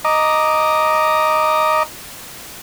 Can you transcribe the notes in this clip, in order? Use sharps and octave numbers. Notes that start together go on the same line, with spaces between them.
D#5 A#5 D6